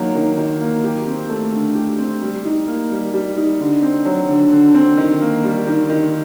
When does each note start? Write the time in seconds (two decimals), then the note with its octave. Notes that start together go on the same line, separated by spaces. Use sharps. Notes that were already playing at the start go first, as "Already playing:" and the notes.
Already playing: D#3 F#3 A#3
0.15 D#3
0.38 D#3
0.60 A#3
0.84 G4
1.07 C4
1.29 A3
1.52 D3
1.75 G4
1.98 C4
2.22 G3
2.45 D#4
2.67 A#3
2.91 G3
3.14 G3
3.37 D#4
3.60 D3
3.82 C4
4.05 F#3
4.29 D3
4.52 D3
4.74 C4
4.97 D#3
5.21 A#3
5.44 G3
5.67 D#3
5.89 D#3